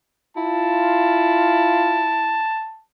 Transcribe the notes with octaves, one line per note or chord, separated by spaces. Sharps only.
E4 F4 A5